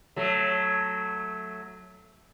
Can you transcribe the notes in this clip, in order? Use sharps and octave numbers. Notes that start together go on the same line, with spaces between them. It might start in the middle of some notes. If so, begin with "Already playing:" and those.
F#3 A3